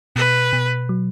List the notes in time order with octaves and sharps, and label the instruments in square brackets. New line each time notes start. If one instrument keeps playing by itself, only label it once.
[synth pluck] B2 [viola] B4
[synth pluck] B2
F#3